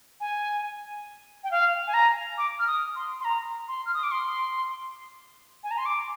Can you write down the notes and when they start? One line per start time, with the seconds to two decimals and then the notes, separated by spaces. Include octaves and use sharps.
0.21 G#5
1.44 G5
1.51 F5
1.87 G#5
1.94 A#5
2.38 D6
2.59 F6
2.67 D#6
2.96 C6
3.20 C6
3.25 A#5
3.68 C6
3.86 F6
3.94 D#6
4.03 D6
4.11 C6
5.64 G#5
5.71 A#5
5.78 C6
5.86 D6